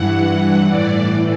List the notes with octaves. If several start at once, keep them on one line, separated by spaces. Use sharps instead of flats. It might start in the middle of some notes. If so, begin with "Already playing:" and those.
Already playing: G2 E3 F#5
A2 E3 D5